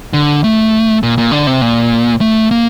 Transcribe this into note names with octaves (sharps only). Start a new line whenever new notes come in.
D3
A3
A#2
A#2
D3
C3
A#2
A3
A#3